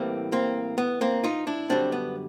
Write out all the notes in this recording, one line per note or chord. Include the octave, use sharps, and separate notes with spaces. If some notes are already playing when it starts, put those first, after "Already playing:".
Already playing: A2 E3 G3 A#3 C4
A#3 C4
B3
A#3 C4
D#4 F4
D4 E4
F#2 D3 G3 C4 D4
B3